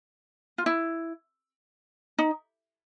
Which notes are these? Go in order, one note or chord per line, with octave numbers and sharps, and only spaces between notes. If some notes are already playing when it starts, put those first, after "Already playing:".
F4
E4
D#4